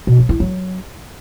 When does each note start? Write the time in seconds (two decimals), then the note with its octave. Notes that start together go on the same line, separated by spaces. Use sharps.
0.07 B2
0.18 F#3
0.29 E4
0.40 F#3